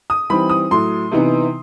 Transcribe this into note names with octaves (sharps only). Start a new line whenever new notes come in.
D#6
E3 G3 C4 D#4 B5
D#6
A2 F#3 A3 C6
C3 E3 B3 D#4